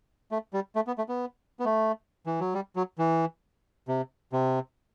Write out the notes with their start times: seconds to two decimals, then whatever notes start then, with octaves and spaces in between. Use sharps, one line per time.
0.31 A3
0.53 G3
0.76 A3
0.87 B3
0.98 A3
1.09 B3
1.60 B3
1.65 A3
2.26 E3
2.40 F#3
2.54 G3
2.76 F#3
2.98 E3
3.88 C3
4.32 C3